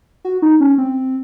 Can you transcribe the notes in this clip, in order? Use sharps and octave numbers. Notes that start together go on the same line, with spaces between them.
F#4
D#4
C#4
C4